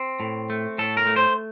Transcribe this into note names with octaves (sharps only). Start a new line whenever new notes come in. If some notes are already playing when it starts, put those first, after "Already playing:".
Already playing: C4
A2
A3
A2 A4
A#4
A3
C5